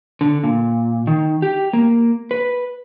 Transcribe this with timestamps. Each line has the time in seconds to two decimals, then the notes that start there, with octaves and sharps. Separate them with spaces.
0.21 D3
0.44 A#2
1.07 D#3
1.42 G4
1.73 A#3
2.31 B4